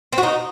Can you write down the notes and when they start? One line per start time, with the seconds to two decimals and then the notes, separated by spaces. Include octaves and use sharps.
0.13 C4
0.18 F#4
0.23 D#4